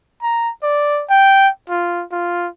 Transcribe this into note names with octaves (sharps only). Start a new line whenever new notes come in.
A#5
D5
G5
F4
F4